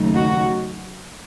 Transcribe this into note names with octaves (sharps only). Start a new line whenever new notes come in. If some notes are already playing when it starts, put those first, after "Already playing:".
Already playing: D#2 C#3 F#3 A3 D#4
F#4